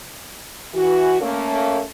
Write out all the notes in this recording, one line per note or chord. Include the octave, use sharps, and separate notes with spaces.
E3 F#4
A3 A#3 C#4